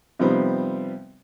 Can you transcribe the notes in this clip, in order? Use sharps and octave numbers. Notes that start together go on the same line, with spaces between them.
C3 F3 G3 B3 C4 D#4